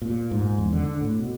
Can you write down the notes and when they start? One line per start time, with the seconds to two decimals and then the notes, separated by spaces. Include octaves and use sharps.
0.02 A#2
0.31 G#2
0.58 E2
0.73 D3
1.01 A2
1.19 B2